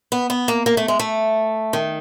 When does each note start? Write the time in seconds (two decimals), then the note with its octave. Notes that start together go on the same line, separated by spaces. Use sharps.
0.12 B3
0.30 B3
0.48 A#3
0.66 A#3
0.77 A3
0.88 G#3
0.99 A3
1.73 D#3